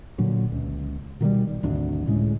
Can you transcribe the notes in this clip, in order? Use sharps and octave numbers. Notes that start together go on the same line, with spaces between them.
A#2 D3 F#3
C#2
B2 D#3 E3 G3
B1
G#1 D2 D4
C#2 A2 C#3 G#3